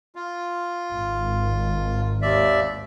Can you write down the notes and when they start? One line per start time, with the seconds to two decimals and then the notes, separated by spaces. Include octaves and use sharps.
0.15 F4
0.91 G#1
2.22 D#2 D5 E5